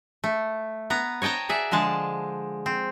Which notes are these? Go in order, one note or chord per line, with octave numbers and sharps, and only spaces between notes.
A3
B3 A#5
C#5 D#5 G5 A5 A#5
F#4 G#4 D5 E5
D3 F3 G#3 A5
C4